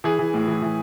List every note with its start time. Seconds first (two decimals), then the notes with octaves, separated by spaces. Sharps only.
0.04 E3 G#4
0.19 E3
0.34 A2
0.48 E3
0.62 E3